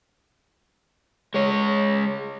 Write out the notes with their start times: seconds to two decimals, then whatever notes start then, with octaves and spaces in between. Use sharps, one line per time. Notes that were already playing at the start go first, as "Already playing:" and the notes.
1.34 G#3 C#5